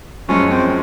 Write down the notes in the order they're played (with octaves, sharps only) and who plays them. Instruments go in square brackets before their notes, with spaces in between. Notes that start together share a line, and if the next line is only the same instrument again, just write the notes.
[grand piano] F#2 F3 G#3 [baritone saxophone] C#4
[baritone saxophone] C4